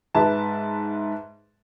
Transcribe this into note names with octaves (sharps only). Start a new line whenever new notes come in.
G#2 B4 E5 A5